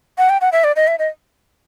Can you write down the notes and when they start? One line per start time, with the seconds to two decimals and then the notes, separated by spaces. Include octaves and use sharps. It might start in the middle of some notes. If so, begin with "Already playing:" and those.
0.18 F#5
0.30 G5
0.41 F#5
0.52 E5
0.64 D5
0.76 D#5
0.87 E5
0.99 D#5